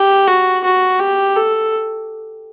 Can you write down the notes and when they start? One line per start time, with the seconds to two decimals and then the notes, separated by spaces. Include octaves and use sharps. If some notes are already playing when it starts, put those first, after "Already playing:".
Already playing: G4
0.28 F#4
0.64 F#4
1.00 G4
1.36 A4